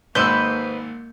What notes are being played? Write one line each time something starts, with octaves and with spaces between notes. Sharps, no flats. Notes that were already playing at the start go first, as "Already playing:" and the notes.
G#1 G#2 A#3 B4 C5 D#5 E6 G6